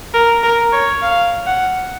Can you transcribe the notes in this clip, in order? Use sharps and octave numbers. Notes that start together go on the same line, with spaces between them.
A#4
A#4
C#5
F5
F#5